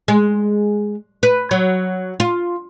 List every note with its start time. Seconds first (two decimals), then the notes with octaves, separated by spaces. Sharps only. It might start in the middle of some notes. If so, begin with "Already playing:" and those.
0.08 G#3
1.23 B4
1.51 F#3
2.20 F4